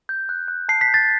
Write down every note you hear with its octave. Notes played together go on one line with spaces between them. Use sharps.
G6
F#6
F#6
A5 C7
B6
G6
A6